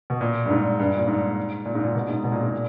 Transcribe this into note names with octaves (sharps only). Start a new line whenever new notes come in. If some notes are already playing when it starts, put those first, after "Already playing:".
B2
A#2
G2
G#2
G2
A#2
G#2
A#2
G#2
A#2
B2
G#2
B2
A#2
G#2
A#2